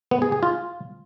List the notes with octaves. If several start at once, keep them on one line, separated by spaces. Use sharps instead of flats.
B3
G#4
G#4
F4